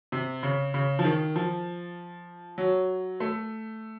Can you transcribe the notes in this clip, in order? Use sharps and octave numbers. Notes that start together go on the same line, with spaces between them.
C3
C#3
C#3
F3
D#3
F3
F#3
A3